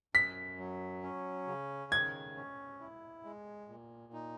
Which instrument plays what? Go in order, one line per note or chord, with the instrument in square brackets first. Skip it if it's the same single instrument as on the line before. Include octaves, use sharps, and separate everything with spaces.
[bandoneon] F#2 [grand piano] B6
[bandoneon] F#3
C#4
C#3
[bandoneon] D#3 [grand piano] G#6
[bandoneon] C#4
E4
G#3
A#2
D#4